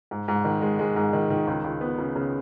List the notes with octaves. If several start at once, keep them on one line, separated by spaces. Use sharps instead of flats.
G#2
G#2
D#3
G#3
G#3
G#2
D#3
D#3
C#2
C#2
B3
C#3
C#3